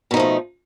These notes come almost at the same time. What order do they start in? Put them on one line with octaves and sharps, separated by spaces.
B2 D#4 F3 A3